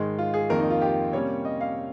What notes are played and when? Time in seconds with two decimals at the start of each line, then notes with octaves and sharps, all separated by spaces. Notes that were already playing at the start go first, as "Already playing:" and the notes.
Already playing: G#2 D#3 G#3
0.18 F4
0.34 G#4
0.50 F2 D#3 A#3 A#4
0.60 D#4
0.70 F4
0.82 G4
1.13 C3 G3 A#3 C#4 C#5
1.45 D#5
1.61 F5